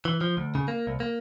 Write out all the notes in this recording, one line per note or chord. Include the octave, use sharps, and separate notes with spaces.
E3
F3
D2
C#3
A#3
C2
A#3